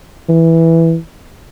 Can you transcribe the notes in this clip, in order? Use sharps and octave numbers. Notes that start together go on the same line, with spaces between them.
E3